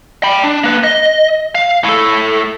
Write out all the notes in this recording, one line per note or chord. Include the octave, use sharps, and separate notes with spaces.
G5 B5
D4
A#3 B4
D#5
F5
A2 A4